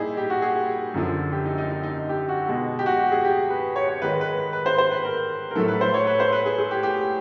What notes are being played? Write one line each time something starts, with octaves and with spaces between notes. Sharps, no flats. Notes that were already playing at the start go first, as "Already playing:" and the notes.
Already playing: A#2 G3 D#4 E4 G#4
G4
F#4
G#4
F#2 D3 F3
G4
D#4
D#4
D#4
D#4
G4
F#4
B2 G#3
G4
F#4
G4
G#4
G4
B4
C#5
C#5
G#2 D#3 G#3 B4
B4
B4
B4
C5
C5
B4
A#4
A#4
A2 F#3 A3 A4
B4
C5
C#5
B4
C5
B4
G#4
G#4
G4
G4